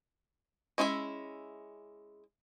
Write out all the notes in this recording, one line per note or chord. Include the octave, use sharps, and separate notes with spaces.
G#3 C#4 E4 B4 E5